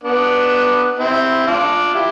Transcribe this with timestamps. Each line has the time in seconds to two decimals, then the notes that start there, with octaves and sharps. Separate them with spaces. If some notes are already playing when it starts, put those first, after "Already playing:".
0.04 B3 D4
0.99 C4 E4
1.46 D4 F4
1.94 E4 G4